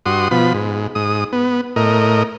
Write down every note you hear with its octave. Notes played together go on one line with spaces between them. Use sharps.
G2 F#4 C6 D#6
B2 F3 B5
G#2
G#2 D#6
B3
A2 A#4 D#5